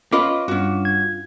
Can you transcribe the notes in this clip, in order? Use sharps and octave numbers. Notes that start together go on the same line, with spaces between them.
C#4 F4 B4 D#5 D6
G2 C#4 F#4
G#6